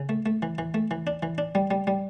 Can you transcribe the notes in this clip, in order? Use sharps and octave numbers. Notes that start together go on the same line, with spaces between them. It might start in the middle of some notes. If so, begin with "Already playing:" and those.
Already playing: C#3
A3
A3
E3
E3
A3
E3
D4
E3
D4
G3
G3
G3